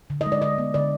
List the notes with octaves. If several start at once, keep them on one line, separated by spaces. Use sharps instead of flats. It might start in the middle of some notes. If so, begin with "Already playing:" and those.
D3
D#5
G#3
D5
D3 D#5
B3
D3 D5